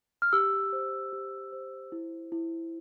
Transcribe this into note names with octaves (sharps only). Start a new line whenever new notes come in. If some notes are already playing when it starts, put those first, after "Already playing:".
F6
G4 E6
C5
G4
C5
E4
E4